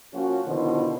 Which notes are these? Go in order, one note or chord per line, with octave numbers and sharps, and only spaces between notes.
F3 A#3 C#4 F#4
B2 D3 D#3 F3 E4 C5